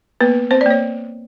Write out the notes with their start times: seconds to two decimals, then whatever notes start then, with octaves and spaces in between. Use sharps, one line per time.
0.20 A#3 B3 B4
0.51 C4 C5
0.61 D5
0.66 A#3 C#5